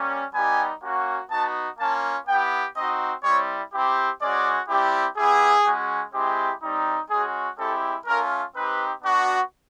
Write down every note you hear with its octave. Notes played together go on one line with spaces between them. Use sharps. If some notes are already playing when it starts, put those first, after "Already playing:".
Already playing: G3 A#3 C#4
G3 B3 D#4 G4 G#5
A#3 C#4 F#4
B3 D#4 F#4 A5
A#3 C#4 F4 A5
B3 E4 G4 G5
C4 D#4 F#4 D#5
G3 C4 E4 C#5
C4 E4 G4
G#3 C#4 F#4 D5
G3 C4 E4 G4
B3 E4 G4 G#4
G#3 C#4 F#4
G#3 C4 E4 G4
G3 C4 D#4
G#3 C#4 F#4 G#4
G#3 C4 E4 G4 A4
A3 C#4 F4 A#4
C4 D#4 G4 B4
B3 D4 F#4